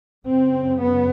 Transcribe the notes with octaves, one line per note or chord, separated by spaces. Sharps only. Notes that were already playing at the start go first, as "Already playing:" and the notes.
F#2 C#3 C4
B3